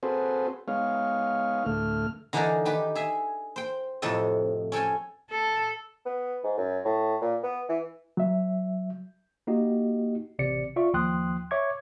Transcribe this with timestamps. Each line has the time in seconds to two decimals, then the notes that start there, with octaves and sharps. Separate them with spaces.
0.03 C4 F#4 G#4 A4 B4 C5
0.68 G#3 B3 D#4 C#5 F5
1.66 D2 A2 A3 F6
2.33 D3 E3 D4 D#4 G#4 A#4
2.65 D#3 G4 B4
2.95 G#4 E5 G#5
3.56 C5 G5
4.02 F2 A2 C3 A4 D#5
4.72 C#4 A4 G5 G#5
5.30 A4
6.06 B3
6.44 G#2
6.57 F#2
6.85 A2
7.21 A#2
7.43 B3
7.69 E3
8.17 F#3 E5
9.47 A#3 D#4 F#4 G4 D#5
10.39 A1 C3 D5 C#7
10.76 F4 D5 E5 C#6
10.93 D#2 F3 G5 C6 D#6 F#6
11.51 C#5 E5 C#6 D6 G#6